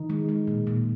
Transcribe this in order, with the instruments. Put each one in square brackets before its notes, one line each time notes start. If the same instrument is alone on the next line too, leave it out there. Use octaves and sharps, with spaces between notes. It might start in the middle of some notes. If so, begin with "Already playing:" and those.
Already playing: [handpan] D#3 D#4
G#3
G#3
A#2
A#2